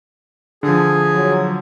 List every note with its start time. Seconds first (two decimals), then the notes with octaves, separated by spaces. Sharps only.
0.63 D3 F3 G#4
1.13 F#3